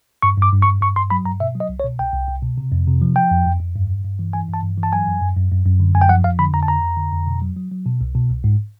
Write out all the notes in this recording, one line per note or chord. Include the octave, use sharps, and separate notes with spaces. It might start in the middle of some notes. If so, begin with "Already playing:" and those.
G2 C#6
G2 D6
G2
C#6
G2
G2 C#6
G2 C6
F#3 B5
G2 A#5
B2 E5
F#3
D#5
C2
C#5
B2
C2 G5
C2
C2
B2
C3
F2
C3
F3
F3 G5
F2
F2
F2
G2
G2
G2
E3
E3 G#5
G2
A5
G2
E3
A5
F#3 G#5
F#2
F#2
F#2
F#2
F#2
D3
F#2 G#5
G5
F3 F#5
F2 F5
D3 B5
F2 A#5
A5
F2 A#5
F2
D3
F2
B2
F#3
F#3
F#3
B2
C2
B2
C2
G#2